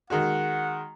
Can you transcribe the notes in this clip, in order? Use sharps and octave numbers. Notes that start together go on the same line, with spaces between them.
D#3 G#3 F#4 F#5